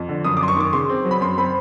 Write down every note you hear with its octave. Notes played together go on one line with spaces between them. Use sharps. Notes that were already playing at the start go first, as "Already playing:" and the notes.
Already playing: F2
D3
F#2 D#6
D6
F#2 C6
C#6
D#3 D6
C#3 C6
C4
F#3
B5
F#2 C6
C4 B5